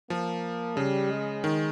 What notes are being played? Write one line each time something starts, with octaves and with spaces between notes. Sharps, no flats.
F3 A#3
C#3 G3
G#3
D#3